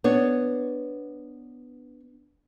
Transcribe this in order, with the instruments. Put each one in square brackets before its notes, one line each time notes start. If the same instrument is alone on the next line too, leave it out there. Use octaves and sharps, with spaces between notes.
[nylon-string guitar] B3 D4 C#5